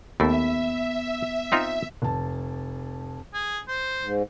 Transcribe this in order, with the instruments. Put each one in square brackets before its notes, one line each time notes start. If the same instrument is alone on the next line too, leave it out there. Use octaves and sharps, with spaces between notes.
[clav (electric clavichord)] D#2 A3 [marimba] B3 [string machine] E5
[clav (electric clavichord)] C4 D#4 F4
[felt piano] F1 A5
[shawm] G#4
C5
[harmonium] G#2